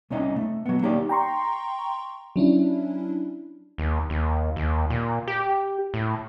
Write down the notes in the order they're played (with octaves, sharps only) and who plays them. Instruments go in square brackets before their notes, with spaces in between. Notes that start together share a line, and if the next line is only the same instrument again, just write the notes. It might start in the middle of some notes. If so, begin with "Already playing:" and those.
[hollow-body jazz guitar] C2 C4 C#4 D#4 D#5
A3
F#3 B3
A#3 D#4 G4 C#5 D5
[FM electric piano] G5 A#5 C6 C#6
F#3 C#4 D4 E4
[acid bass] D#2
D#2
D#2
A#2
G4
A2